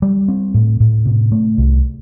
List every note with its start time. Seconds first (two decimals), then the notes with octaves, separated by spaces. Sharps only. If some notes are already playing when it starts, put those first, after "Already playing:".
0.02 G3
0.28 C4
0.54 A2
0.80 A2
1.05 C3
1.32 A3
1.58 C2